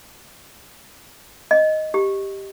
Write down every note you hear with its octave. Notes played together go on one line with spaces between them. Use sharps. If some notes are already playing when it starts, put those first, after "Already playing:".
D#5
G4